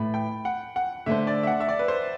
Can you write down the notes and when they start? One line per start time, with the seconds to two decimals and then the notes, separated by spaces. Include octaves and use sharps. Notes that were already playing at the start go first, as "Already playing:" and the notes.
Already playing: A2 E3 A3 B5
0.14 G5
0.45 F#5
0.76 F#5
1.06 D3 A3 E4 A4 C5 E5
1.27 D5
1.43 E5
1.47 F#5
1.60 E5
1.68 D5
1.79 B4
1.88 C5